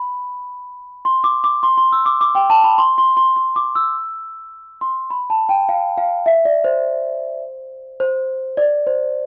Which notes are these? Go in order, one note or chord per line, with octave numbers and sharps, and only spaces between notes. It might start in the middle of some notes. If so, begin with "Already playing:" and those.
Already playing: B5
C6
D6
D6
C6
C6
E6
D6
D6
G5
A5
B5
C6
C6
C6
C6
D6
E6
C6
B5
A5
G5
F5
F5
E5
D5
C5
C5
D5
C5